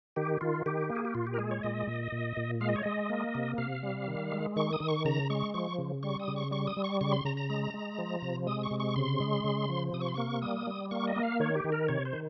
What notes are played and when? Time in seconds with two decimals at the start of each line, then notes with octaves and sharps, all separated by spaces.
0.16 D#3 G4
0.41 D#3 F4
0.66 D#3 G4
0.90 A#3
0.96 G#4
1.05 G4
1.15 A#2 F4
1.27 G4
1.34 A#4
1.38 G#3 G#4
1.51 C#5
1.63 A#2 D#5
1.87 A#2
2.12 A#2
2.37 A#2
2.61 G#3 F5
2.69 D#5
2.76 C#5
2.83 G#3 D#5
3.10 A#3
3.35 C3
3.58 C3 F5
3.83 G3
4.08 D#3
4.32 G#3
4.56 D#3 C#6
4.73 D#6
4.80 D#3
4.88 C#6
5.05 C#3 A#5
5.30 G#3 C#6
5.54 F3 C#6
5.78 C#3
6.03 G3 C#6
6.19 D#6
6.28 C#3
6.36 C#6
6.51 G3 C#6
6.67 D#6
6.77 G3
6.84 C#6
7.01 C#3 C#6
7.12 C6
7.25 C#3 A#5
7.37 A#5
7.50 G#3
7.74 G#3
7.98 F3
8.22 C3
8.46 G#3 D#6
8.63 C#6
8.71 C3
8.80 C#6
8.96 C#3 C6
9.20 G#3
9.44 C#3
9.69 F3
9.93 C3 D#6
10.01 C#6
10.08 C6
10.15 A#3 C#6
10.42 G3 D#6
10.67 G3
10.91 A#3 C#6
11.07 D#5
11.16 A#3
11.23 F5
11.40 D#3 C#5
11.56 G4
11.64 D#3
11.72 A#4
11.88 C3 C#5
12.05 C5
12.13 D#3